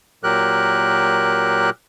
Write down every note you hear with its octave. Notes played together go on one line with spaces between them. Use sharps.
A#2 F#3 G4 A#4 F#6